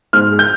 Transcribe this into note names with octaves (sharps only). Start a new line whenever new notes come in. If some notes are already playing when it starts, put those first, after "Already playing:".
G#2 F6
G#3
G6